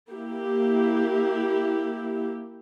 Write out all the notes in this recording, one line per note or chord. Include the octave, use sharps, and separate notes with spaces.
A#3 E4 G4